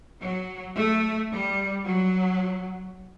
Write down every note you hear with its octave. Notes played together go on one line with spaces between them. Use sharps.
F#3
A3
G3
F#3